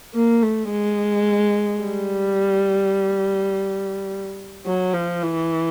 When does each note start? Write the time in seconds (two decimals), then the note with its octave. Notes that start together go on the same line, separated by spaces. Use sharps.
0.14 A#3
0.43 A3
0.70 G#3
1.83 G3
4.66 F#3
4.94 F3
5.23 E3